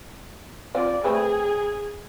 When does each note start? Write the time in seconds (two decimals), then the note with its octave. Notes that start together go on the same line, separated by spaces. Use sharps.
0.75 C4 F4 C5 D5
1.04 A3 C4 G#4 B4